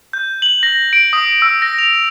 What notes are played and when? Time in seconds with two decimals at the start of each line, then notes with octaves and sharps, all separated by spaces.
0.13 G6
0.42 F#7
0.63 A#6
0.93 D7
1.13 D#6
1.42 E6
1.62 A#6
1.78 F7